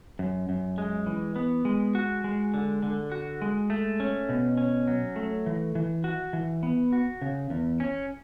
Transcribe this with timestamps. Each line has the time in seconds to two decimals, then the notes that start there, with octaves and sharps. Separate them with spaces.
0.19 F#2
0.49 F#2
0.78 G#3
1.06 E3
1.36 B3
1.65 G#3
1.95 F#4
2.24 G#3
2.54 D3
2.82 D3
3.12 F#4
3.42 G#3
3.70 A3
4.00 C#4
4.29 B2
4.57 C#4
4.88 F#3
5.16 A3
5.46 E3
5.75 E3
6.04 F#4
6.33 E3
6.63 B3
6.93 F#4
7.22 C#3
7.50 E2
7.80 C#4